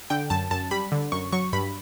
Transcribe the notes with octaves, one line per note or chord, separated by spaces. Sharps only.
D3 G5
F#2 A5
F#2 A5
G3 B5
D3
F#2 C#6
F#3 C#6
G2 B5